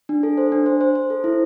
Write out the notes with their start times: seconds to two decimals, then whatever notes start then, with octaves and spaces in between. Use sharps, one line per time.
0.09 D4
0.23 A4
0.38 C5
0.52 D4
0.66 C5
0.81 C5
0.95 C5
1.10 A4
1.24 E4